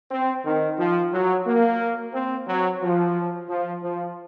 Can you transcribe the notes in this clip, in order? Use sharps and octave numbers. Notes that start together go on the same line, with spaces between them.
C4
D#3
F3
F#3
A#3
C4
F#3
F3
F3
F3